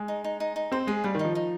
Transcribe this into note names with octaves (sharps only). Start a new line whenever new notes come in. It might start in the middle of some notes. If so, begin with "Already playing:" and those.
Already playing: G#3
D#4
D#4
D#4
D#4
C4 C5
G#3 G#4
G3 F5
D#3
D#4
F3
D#4